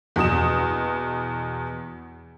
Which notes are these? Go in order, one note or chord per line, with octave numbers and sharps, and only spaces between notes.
E2 B2 D#6 E7